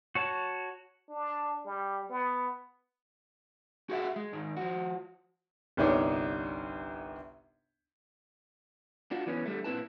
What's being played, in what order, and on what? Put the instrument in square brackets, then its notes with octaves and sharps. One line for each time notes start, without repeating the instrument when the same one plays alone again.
[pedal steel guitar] F#4 C#5 A5
[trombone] D4
G3
B3
[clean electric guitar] F#4 G#4 C5 E5 F#5
G#3
G#2 D#3
F3 F#4
[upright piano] G1 C2 D4 D#4 C#5
[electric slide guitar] D4 F4 F#4
E3 B3 C#4
D3 G3 A3
A#2 C4 E4 B4 A5